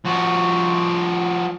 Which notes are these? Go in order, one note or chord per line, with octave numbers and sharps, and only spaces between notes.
F3 F#4